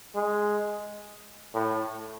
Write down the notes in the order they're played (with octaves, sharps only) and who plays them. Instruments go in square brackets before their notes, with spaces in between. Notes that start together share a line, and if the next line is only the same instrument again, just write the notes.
[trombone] G#3
A2